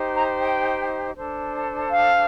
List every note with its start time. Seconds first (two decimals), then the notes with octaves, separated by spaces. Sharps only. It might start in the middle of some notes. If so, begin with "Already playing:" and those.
Already playing: D#4 G4 C5
0.14 A#5
0.39 G5
1.15 D4 A4 C5
1.91 F5